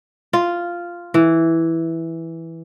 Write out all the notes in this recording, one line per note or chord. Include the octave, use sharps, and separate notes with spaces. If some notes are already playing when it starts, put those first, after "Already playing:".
F4
E3